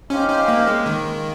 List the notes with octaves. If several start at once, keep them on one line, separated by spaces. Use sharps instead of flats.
C#4 D#4 G4 C5 F5
C#4
A#3
G#3
D#3